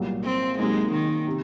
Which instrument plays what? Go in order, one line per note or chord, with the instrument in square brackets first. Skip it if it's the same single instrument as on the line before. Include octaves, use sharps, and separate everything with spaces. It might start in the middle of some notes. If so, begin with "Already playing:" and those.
Already playing: [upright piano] C2 A#2 F#3 A#3
[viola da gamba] C4
[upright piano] C3 F#3 A#3 D#4 [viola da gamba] G#3
[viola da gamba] D#3
[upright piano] C3